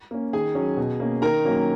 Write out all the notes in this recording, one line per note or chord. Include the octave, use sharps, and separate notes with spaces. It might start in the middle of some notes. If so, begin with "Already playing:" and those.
A#3 C#4
D#3 G#4 G#5
F#3 C#4
B2
A#3 C#4
D#3 A#4 A#5
F#3 A#3 C#4